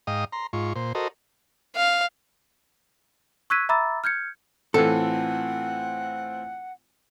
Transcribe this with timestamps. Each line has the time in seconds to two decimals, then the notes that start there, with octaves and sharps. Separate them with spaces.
0.07 G#2 D#5 F5 G5 D#6
0.33 A#5 C6
0.53 G#2 F4 C#6
0.76 A#2 C5
0.95 F#4 A4 A#4 C5 D#5
1.76 F5
3.50 C#6 E6 F#6 G#6 B6 D#7
3.69 E5 A#5 B5 D6 E6 A6
4.04 F6 G6 G#6 C#7
4.74 A2 E3 C4 F4 A4 F#5